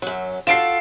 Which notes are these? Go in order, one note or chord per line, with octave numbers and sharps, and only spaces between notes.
F#2 F#3
F4 F#4 A4 C7 D7 E7